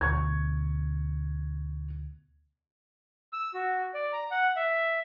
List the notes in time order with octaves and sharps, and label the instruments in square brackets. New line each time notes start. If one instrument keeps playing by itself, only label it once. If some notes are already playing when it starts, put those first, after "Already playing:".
[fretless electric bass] D2 B2 [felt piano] C#6 G#6
[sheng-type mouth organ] E6
F#4
D5
A#5
F#5
E5